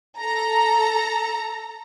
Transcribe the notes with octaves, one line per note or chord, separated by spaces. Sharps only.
A4 A#5